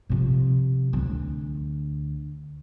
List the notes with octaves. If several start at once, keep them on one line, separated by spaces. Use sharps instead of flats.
C3 F3
D2 D4